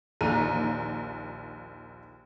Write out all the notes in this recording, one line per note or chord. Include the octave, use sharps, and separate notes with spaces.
A#1 D#2 A#5 D#7